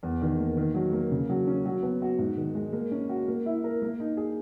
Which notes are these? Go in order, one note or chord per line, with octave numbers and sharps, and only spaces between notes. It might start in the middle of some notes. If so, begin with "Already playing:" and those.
E2
D#3
A#3
D#3
F#3
A#3
C#3
F#3
C#4
F#3
B3
F#4
G#2
D#3
G#3
A#3
C#4
F#4
A#3
E4
A#4
A#3
D#4
G#4